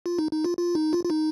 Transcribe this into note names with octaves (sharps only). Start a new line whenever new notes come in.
F4
D#4
D#4
F4
F4
D#4
F4
F4
D#4